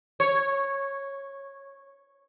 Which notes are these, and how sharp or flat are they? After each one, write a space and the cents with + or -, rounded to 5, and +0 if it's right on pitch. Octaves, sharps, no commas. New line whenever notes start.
C#5 -10